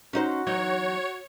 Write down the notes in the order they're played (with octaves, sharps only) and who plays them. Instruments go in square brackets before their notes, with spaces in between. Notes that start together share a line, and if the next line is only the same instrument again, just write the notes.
[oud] C#4 D#4 C5 [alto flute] F#4
[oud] E2 F#3 D#4 [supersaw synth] C#5